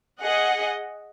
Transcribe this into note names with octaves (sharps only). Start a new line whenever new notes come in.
G#4 D#5 F#5